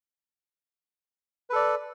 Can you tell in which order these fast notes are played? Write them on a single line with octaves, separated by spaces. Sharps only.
B4 A4 D5